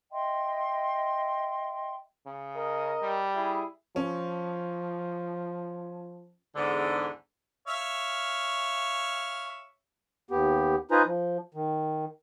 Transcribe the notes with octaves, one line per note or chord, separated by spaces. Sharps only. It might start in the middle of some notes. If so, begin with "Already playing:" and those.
D#5 E5 G5 C6
C#3
A#4 D#5
G3
E4 G#4
F3 C#4
E2 G#2 D3
C#5 E5 F5
D#2 B3 G4
D#4 F4 B4 C5 G#5 A#5
F3
D#3